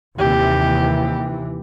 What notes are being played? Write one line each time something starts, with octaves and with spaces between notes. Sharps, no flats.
D#2 C3 E3 G4